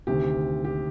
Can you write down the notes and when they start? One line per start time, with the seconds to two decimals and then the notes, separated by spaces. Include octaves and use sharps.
0.07 D2 C3 D#3 G4
0.65 G4